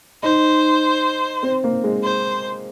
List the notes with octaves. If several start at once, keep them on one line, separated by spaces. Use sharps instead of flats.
D#4 C5
C4
A#3
G#3
C5